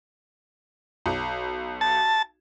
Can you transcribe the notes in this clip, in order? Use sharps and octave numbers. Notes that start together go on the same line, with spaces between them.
B1
A5